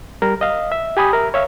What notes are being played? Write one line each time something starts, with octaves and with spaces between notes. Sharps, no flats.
G3 A#4
D#5 F5
E5
G4 G#5 B5 D#6
A#4 E5
C#5 E5 F5